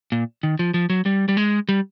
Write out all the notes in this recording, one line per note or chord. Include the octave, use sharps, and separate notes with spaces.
A#2
D#3
F3
F3
F#3
G3
G3
G#3
G3